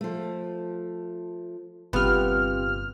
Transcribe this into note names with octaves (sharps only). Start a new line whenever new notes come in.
F3 A3
G1 C3 B3 F4 G4 F6